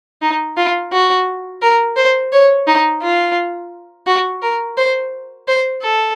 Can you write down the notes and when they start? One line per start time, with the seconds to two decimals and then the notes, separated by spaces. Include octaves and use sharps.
0.22 D#4
0.57 F4
0.92 F#4
1.62 A#4
1.96 C5
2.32 C#5
2.67 D#4
3.02 F4
4.07 F#4
4.42 A#4
4.77 C5
5.48 C5
5.83 A4